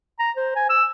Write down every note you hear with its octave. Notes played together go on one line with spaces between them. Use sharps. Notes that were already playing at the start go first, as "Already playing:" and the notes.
A#5
C5
G#5
E6